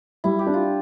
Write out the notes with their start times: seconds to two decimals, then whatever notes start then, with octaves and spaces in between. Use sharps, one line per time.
0.24 G3 E4
0.39 G4
0.47 D4
0.54 F4